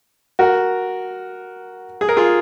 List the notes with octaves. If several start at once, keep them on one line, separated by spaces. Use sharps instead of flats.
F#4 A#4
G#4
A#4
F4 G#4